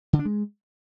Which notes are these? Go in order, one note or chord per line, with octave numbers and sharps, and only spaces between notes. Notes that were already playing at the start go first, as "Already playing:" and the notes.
D3
D4
G#3